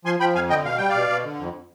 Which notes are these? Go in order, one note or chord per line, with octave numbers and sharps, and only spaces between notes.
F3 G#5 C6
F3 G5 B5
F2 F5 G#5
D3 D#5 G5
B2 F5
G3 G5
D5 F5
B2
B2
D3
F2